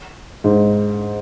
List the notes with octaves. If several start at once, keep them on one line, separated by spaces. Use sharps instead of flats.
G#2